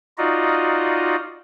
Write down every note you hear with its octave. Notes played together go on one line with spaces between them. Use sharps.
D#4 F4 F#4 D5 D#5